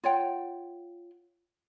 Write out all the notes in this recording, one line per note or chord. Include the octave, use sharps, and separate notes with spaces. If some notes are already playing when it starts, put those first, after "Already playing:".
F4 C#5 F#5 G5